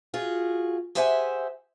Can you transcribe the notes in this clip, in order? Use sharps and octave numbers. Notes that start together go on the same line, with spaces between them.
F4 F#4 G#4
G4 G#4 C5 E5 F#5 G#5